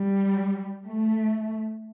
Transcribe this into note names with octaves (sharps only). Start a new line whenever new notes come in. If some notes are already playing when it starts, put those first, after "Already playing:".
Already playing: G3
A3